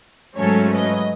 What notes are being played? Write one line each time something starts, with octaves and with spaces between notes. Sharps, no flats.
G#2 F#3 A3 C#4 A4 C#5
B4 D#5